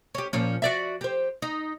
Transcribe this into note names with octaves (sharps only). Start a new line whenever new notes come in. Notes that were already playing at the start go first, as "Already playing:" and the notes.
C#4 G4
A#2 F3 C#4
F#4 D5 E5
G4 C5
D#4